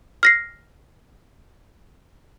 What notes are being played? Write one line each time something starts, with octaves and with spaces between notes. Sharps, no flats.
F6 A#6 C7